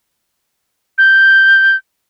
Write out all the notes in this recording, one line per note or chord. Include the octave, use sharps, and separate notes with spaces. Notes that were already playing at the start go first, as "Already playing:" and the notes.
G6